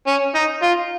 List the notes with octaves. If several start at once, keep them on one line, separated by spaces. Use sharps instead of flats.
C#4
D#4
F4